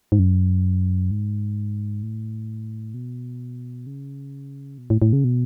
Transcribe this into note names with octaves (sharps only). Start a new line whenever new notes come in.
G#2
F#2
G#2
A2
B2
C#3
B2
A2
A2
C#3
B2